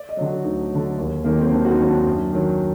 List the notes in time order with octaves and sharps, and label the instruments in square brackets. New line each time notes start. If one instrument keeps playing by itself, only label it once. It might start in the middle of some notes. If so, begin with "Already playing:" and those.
Already playing: [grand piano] D5
D#5
D3 F#3
F#4
D2 D#4
D3 F#3
D#2
D#3 F#3 A#3
C4
D#2 D4
F#4
D#4
D#3 F#3
D4
F#2
D#3 F#3